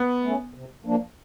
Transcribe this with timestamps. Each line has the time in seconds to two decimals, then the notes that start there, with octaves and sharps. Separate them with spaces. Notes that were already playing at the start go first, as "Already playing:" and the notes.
Already playing: B3
0.23 A3 C#4
0.54 C3
0.85 F3 A#3 D4